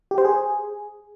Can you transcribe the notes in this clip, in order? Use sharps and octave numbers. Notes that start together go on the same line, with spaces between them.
G4
C5
G#4